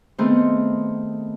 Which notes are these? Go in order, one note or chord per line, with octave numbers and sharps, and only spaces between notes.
D#3 A3 B3 C4 G#4 C5